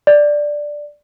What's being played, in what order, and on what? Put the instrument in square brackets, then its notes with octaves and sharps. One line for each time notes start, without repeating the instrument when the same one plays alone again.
[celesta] D5